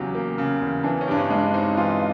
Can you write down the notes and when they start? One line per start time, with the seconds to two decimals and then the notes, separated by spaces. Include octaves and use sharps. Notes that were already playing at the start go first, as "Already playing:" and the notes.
Already playing: E2 C#3 F#3 G4
0.15 A#3
0.38 C#3
0.61 E2
0.84 E3 D4
1.01 C#4
1.08 G2 D4
1.19 C#4
1.30 G#3
1.36 D4
1.54 C4 D#4
1.77 E3 F4